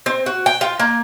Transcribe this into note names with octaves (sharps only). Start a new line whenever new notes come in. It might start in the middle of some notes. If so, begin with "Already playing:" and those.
C4
F#4
G5
F4
A#3